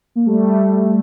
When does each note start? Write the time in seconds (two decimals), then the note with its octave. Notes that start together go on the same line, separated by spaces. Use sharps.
0.16 A#3
0.26 G3 A3